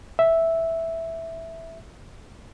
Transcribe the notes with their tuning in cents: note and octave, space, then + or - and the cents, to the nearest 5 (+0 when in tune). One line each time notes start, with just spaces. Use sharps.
E5 -5